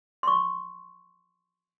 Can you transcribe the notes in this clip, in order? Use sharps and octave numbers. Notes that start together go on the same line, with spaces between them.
C6 C#6